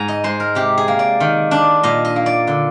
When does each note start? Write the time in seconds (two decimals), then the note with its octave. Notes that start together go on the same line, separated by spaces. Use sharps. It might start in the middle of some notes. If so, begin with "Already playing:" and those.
Already playing: G#2 G#5 A#5
0.08 D#5
0.24 G#3 C5
0.40 A#4
0.55 C3 G4
0.78 G#4
0.88 A#3
0.99 D5
1.20 D#3
1.51 D4
1.83 A#2 D#5
2.05 D#5
2.16 A#3
2.26 D5
2.47 D3